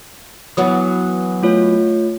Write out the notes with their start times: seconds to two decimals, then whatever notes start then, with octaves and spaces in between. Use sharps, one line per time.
0.57 E3 F#3 B3 D#6
1.43 A3 F4 C#5